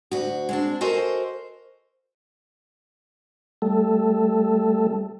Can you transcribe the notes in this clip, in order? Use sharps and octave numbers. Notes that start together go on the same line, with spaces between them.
D2 F#4
G#3 C4 D4
F#4 A4 A#4 C5 D#5 G#5
G3 A3 A4